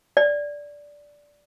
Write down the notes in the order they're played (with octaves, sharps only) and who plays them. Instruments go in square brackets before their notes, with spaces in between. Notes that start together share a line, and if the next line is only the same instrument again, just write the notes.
[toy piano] D5